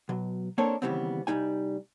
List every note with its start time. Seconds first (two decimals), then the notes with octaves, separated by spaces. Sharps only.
0.09 B2 F#3
0.58 A#3 C4 D4 A4 A#4 C#5
0.82 D#2 C#3 E3 G3 B3 C4
1.27 C2 F#3 G3 D#4 G#5